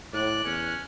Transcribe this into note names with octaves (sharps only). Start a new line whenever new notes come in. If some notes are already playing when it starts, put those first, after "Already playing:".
A2 D5 F#6
E2 C#4